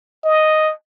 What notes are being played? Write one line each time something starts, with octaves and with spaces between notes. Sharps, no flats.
D#5